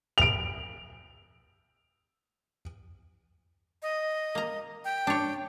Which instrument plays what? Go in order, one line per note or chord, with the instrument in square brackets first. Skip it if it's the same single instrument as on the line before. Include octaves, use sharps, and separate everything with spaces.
[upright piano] D7 F7
[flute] D#5
[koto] A#3 A#5
[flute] G5
[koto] D4 C#5